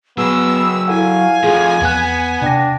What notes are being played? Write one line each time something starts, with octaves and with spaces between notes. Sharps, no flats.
F#3 B3 G#4 E6
E4 A4 F5 F#5 G#5
F3 A3 G#4
E2 B3 F#6
C3 D4 G5 A#6